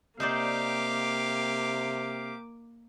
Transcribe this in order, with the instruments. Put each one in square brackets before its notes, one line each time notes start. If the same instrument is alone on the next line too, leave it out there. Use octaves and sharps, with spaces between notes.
[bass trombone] C3 [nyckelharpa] A#3 D6 [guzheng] D#4 C5 D5 [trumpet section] G4 F5